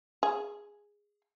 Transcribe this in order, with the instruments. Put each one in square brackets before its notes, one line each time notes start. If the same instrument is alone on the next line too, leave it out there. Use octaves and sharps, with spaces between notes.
[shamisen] G#4